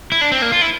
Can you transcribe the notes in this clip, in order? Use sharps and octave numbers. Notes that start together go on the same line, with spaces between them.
E4
D4
C4
A#3
F4
E4